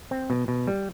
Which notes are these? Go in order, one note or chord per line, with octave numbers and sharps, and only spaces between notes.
C4
B2
B2
G3